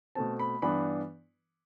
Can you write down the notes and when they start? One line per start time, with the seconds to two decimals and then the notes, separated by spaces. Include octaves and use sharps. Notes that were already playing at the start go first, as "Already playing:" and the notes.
0.15 B2 A3 C4 A5
0.39 B5
0.62 G2 E3 B3 D4 B5